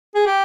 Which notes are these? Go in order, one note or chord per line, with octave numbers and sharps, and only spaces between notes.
G#4
G4